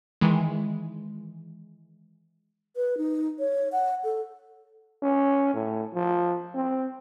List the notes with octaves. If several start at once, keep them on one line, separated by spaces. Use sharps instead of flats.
D#3 E3 G#3
B4
D#4
C#5
F#5
A4
C#4
A2
F3
C4